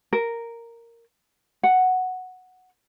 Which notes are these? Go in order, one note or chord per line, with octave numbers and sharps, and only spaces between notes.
A#4
F#5